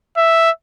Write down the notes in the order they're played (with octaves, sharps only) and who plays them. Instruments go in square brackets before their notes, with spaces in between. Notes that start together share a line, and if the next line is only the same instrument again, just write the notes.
[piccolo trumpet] E5